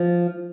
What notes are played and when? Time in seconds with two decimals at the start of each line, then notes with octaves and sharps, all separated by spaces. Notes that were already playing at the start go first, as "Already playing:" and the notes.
Already playing: F3